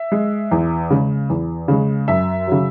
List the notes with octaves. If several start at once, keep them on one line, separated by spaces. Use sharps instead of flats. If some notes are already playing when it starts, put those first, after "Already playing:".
Already playing: E5
G#3
E2
C#3 G#3
E2
C#3 G#3
F#2 E5
C#3 F#3